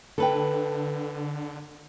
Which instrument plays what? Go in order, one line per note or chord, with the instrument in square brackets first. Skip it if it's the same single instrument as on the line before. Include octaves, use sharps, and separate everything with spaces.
[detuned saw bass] D3 [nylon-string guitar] A4 B4 G5